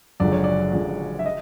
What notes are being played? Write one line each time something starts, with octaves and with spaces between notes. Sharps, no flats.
F#1 F#2 D3 F3 G#3 D5
C#5
D5
F#1 F#2 D3 F3 G#3
E5
D#5